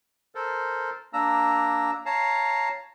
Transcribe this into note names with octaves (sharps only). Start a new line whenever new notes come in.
A4 A#4 C5
A#3 D4 A#5 E6
C#5 F5 A5 A#5